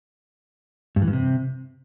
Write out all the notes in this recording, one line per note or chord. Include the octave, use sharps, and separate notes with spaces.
G2
E3
G2
C3